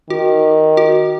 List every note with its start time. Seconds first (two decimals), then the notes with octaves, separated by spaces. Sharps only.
0.10 D#3 F#4
0.77 F#4